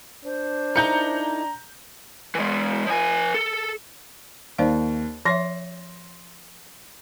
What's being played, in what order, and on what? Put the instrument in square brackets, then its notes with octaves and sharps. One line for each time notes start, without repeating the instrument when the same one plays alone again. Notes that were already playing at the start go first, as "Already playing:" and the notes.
[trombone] D4 [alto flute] C5
[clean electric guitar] D#4 E4 A#4 [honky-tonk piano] A#5 G6 C#7
[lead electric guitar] E3 G#3
F3 G#5
A4
[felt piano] D#2 [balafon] C5 D5 F5
[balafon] F3 C#5 E5 [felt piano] C6 A#6